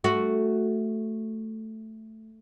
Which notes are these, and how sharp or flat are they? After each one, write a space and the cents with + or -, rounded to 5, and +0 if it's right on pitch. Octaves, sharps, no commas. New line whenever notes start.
A3 +0 F#4 +0